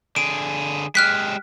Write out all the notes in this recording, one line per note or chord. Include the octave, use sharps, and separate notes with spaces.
D3 G#4 D7
G#3 G4 F6 F#6 B6